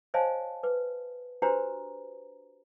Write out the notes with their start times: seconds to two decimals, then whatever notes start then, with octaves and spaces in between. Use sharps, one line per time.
0.14 C5 C#5 D#5 F5 G#5 A5
0.63 B4
1.42 D4 F#4 G4 B4 C5 A#5